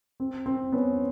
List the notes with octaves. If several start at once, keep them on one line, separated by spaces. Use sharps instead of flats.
C4
C4
B3 C#4